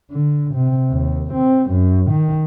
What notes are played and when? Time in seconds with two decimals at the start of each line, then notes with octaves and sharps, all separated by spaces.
0.11 D3
0.55 C3
0.91 D#2
1.34 C4
1.70 F#2
2.11 D#3